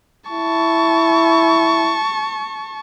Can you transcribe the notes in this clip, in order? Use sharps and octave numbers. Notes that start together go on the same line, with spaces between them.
E4 A5 C#6